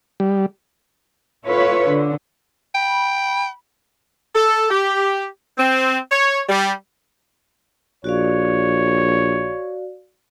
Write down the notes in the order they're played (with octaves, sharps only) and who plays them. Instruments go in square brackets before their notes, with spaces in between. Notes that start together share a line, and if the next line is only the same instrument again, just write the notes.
[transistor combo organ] G3
[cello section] E4 F4 A4 B4 C#5
D3
[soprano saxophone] G5 [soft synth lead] B5
[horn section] A4
G4
C4
C#5
G3
[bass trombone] A#1 [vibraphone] F#4 D5 F5 [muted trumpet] C#5